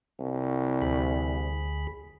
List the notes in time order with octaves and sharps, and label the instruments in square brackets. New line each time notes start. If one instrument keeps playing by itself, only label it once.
[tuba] C2
[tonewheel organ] D2 G#4 B5